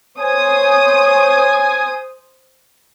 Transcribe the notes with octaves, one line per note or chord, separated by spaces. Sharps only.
C5 C#5 G#5 D#6